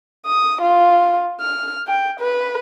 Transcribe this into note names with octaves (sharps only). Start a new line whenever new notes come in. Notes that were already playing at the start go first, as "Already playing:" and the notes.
D#6
F4
F6
G5
B4